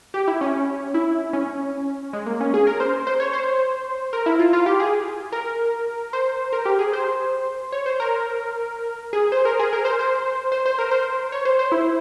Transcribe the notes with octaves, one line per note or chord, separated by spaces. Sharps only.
G4
E4
C#4
E4
C#4
G#3
A#3
C#4
G#4
A#4
C5
C5
C#5
C5
A#4
E4
F4
F4
G4
G#4
A#4
C5
A#4
G4
G#4
C5
C#5
C5
A#4
G#4
C5
A#4
G#4
A#4
C5
C5
C5
C5
A#4
C5
C#5
C5
C5
E4